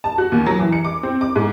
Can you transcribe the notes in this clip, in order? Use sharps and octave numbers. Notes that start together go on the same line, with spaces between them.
A5
F#4
D#2
F#3
E3
C#7
D6
C4
D6
G#2